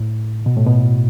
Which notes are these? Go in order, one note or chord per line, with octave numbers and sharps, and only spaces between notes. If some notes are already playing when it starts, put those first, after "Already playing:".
Already playing: A2
B2
A2
B2